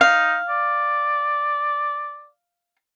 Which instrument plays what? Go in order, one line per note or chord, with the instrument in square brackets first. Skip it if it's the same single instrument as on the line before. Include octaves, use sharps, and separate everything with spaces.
[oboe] D#4 [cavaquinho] F5
[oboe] D5